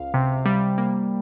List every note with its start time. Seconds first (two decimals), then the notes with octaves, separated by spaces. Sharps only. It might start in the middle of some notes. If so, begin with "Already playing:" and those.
Already playing: C#2 F5
0.14 C3
0.46 G3
0.78 A#3